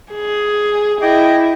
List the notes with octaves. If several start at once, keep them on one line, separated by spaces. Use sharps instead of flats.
G#4
E4 D#5 G5 D6